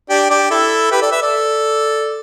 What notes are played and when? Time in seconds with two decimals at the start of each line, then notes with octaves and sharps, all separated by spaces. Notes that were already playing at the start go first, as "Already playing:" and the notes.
0.10 D4 G4
0.30 D4 G4
0.51 E4 A4
0.91 G4 B4
1.02 A4 D5
1.11 B4 E5
1.22 A4 D5